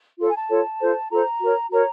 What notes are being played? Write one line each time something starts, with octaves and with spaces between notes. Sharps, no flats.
F4 A4 C#5
G#5
A5
F4 A4 C#5
F4 A4 C5
F4 A4 C5 A#5
F#4 A#4 C#5
F#4 A#4 C#5 A#5